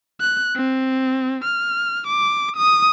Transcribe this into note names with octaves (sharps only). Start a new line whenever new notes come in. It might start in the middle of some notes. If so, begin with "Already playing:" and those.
F#6
C4
F6
D6
D#6